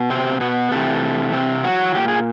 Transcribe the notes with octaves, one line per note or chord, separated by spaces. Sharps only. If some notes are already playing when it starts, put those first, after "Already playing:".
Already playing: B2
C3 C4
B2 B3
C3 E3 A3
C3 C4
F#3 F#4
A#2 G4
G#4